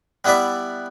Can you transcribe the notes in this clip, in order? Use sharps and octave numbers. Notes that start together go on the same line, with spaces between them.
G3 B3 E4 B4 D5 E5